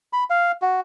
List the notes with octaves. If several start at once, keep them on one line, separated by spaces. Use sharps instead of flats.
B5
F5
F#4